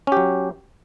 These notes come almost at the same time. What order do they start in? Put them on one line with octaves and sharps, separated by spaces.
C#4 G4 F#3